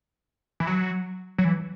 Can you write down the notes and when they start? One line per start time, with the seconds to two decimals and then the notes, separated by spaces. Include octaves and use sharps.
0.60 E3
0.67 F#3
1.38 F#3
1.44 E3